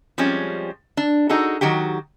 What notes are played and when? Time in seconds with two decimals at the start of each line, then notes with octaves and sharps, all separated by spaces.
0.18 F3 G3 G#3 C4 C#4
0.97 D4
1.29 D#4 F#4 G#4 A4
1.61 D#3 F#3 F#4 G4